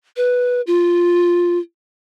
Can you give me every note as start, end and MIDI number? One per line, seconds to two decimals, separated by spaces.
0.17 0.61 71
0.67 1.58 65